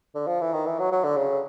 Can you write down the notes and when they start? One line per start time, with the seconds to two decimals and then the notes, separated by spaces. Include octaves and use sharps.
0.15 D3
0.27 F3
0.41 E3
0.54 D#3
0.66 E3
0.79 F#3
0.92 F#3
1.04 D3
1.17 C#3